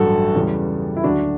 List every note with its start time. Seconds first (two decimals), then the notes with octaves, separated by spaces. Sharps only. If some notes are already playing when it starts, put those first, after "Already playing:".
Already playing: A1 G2 F#3 F#4 A4
0.35 E2 C#3 G3
0.97 E4
1.03 D2 D3 F#3 D4 F#4